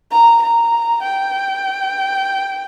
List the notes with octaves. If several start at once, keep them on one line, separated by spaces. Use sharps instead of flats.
A#5
A#5
G5